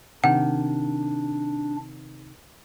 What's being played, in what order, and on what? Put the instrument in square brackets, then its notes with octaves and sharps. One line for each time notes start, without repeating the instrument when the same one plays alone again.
[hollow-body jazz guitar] C3 D#3 [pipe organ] D4 [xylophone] F#5